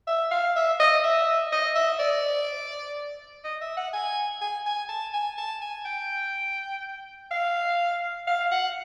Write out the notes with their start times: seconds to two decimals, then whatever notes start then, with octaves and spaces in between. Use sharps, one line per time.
0.07 E5
0.31 F5
0.56 E5
0.80 D#5
1.04 E5
1.52 D#5
1.75 E5
1.99 D5
3.44 D#5
3.61 E5
3.77 F#5
3.93 G#5
4.41 G#5
4.66 G#5
4.89 A5
5.14 G#5
5.38 A5
5.61 G#5
5.85 G5
7.31 F5
8.27 F5
8.51 F#5